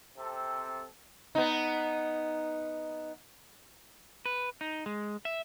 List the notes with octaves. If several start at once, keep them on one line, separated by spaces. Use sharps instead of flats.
C3 C4 A4
B3 D#4
B4
D#4
G#3
E5